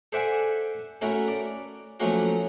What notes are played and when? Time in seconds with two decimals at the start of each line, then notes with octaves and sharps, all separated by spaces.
0.12 A4 C5 D5 E5 F#5 G#5
1.01 A3 C#4 E4 F#4 A#4
1.28 D5
2.00 F3 F#3 A3 A#3 C#4 F#4